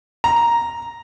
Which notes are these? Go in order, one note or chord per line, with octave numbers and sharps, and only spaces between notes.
A#5